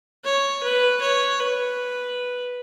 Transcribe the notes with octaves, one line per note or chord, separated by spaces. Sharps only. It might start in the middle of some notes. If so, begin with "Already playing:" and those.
C#5
B4
C#5
B4